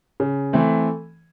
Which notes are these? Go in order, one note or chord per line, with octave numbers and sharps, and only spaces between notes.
C#3
E3 A3 C4